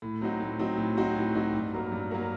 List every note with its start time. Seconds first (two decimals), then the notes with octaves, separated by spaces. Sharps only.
0.02 A2
0.21 F#3 C4 D#4 F#4
0.40 A2
0.59 F#3 C4 D#4 F#4
0.77 A2
0.97 F#3 C4 D#4 F#4
1.17 A2
1.35 F#3 C4 D#4 F#4
1.53 G2
1.73 F#3 A#3 F#4 A#4
1.92 G2
2.11 F#3 A#3 F#4 A#4